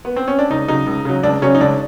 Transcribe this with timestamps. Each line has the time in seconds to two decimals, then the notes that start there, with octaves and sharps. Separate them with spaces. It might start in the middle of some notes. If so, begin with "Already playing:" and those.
0.05 B3
0.16 C4
0.28 C#4
0.39 D4
0.50 C#2 D#4
0.68 C#3 F#3 D#4
0.86 C#2
1.05 C#3 F#3
1.23 C#2 D4
1.42 C#3 F#3 C#4
1.55 D#4
1.60 C#2 D4